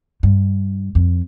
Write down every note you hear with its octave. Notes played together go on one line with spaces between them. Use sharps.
G2
F2